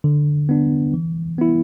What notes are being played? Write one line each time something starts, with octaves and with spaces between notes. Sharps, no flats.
D3
B3 D4
E3
B3 E4